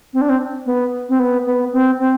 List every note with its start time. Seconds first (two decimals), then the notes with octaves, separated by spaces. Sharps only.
0.13 C4
0.21 D4
0.29 C4
0.66 B3
1.09 C4
1.19 B3
1.46 B3
1.72 C4
1.99 C4